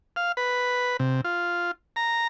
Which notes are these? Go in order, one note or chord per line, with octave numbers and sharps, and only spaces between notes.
F5
B4
C3
F4
A#5